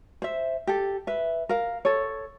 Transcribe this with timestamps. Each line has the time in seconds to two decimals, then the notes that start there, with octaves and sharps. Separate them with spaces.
0.22 C5 E5
0.67 G4 A4
1.07 B4 E5
1.49 A#4 F5
1.85 A4 C#5